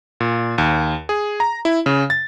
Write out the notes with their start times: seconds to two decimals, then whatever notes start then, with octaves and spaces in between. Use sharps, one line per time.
0.20 A#2
0.58 D#2
1.09 G#4
1.40 A#5
1.65 E4
1.86 C#3
2.10 A6